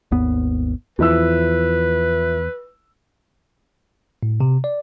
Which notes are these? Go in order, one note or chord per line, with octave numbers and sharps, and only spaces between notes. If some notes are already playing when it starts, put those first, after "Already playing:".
G#1 D#2 B3
E2 F3 E4 B4 E6
A2
C3
D5